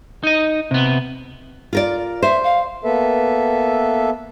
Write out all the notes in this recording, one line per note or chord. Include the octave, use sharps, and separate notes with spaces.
D#4 D#5
C3 B3
F4 A#4 D5
C5 E5
F5
A#3 B3 A4 B4 E5